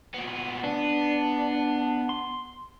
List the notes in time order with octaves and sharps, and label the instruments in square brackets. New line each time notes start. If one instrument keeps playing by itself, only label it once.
[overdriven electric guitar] A#2 B3
[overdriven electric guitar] B3 [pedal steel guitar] D4
[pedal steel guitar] C6